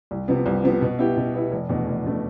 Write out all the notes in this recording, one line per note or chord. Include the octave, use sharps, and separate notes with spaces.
C2
C3 F3 B3
C2
C3 F3 B3
B2
B3 E4 G4
B2
B3 E4 G4
F1
E2 B2 A3 D4
F1
B2 A3 D4